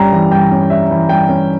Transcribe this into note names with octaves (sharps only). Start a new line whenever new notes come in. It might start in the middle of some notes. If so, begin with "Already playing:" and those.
Already playing: G2 G3 C#4 A#5
E3
G2 G5
C#4
G3 E5
E3
G2 G5
C#4